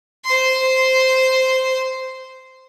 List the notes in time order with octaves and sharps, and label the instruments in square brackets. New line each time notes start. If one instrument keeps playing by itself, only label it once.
[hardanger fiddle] C5 C6